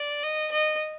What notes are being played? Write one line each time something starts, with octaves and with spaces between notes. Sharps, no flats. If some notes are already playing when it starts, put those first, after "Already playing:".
Already playing: D5
D#5
D#5